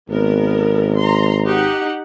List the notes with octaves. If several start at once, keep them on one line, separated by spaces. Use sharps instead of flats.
G#1 B3 A#4
A#5 C6
D#4 G4 F#5